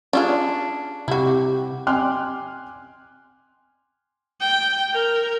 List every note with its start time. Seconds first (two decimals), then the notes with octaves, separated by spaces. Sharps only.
0.13 C#4 D4 F4 G#4
1.08 C3 E4 F#4 G4
1.87 G5 G#5 C6 D6 F6 F#6
4.41 G5
4.93 A#4